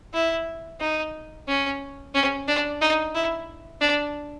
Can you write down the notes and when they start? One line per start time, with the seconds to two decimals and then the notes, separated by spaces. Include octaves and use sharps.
0.14 E4
0.80 D#4
1.48 C#4
2.14 C#4
2.48 D4
2.81 D#4
3.15 E4
3.81 D4